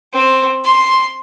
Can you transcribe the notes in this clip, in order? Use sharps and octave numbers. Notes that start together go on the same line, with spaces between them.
C4
C6